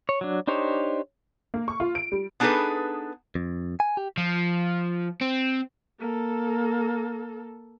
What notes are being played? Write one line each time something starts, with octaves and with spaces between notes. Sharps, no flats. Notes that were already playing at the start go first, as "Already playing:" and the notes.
C#5
F#3 D4
D4 D#4 G4 C5 C#5
A#3
C#6
F4
D7
G3
B3 D4 D#4 G#4 A4 B4
F2
G#5
G4
F3
C4
A#3 A4